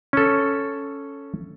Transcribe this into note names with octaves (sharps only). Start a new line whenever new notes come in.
C#4 A4